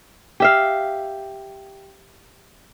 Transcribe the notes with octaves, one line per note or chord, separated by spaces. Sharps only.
G4 E5 F5